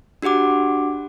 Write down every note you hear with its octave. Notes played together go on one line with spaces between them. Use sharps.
D4 F#4 G4 F#5 D6